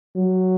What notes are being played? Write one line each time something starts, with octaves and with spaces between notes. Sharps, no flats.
F#3